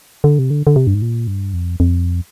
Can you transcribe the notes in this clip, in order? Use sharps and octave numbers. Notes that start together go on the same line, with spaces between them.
D3
C3
D3
D3
C3
G2
G#2
A#2
G2
F2
F2